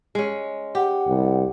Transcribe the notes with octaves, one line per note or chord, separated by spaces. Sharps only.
G#3 C#4
G4 F#5
C2